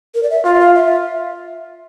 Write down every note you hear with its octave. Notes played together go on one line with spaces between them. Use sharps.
A#4
D5
E5
F4 F5
E5
F5
E5